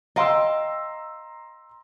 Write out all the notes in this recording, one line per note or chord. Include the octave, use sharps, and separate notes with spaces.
D#5 F5 G5 A#5 C6 E6